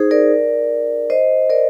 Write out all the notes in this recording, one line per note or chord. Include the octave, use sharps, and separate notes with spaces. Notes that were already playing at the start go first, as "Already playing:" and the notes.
Already playing: D#4 G#4 C5
A#4 D5
C5 D#5
A#4 D5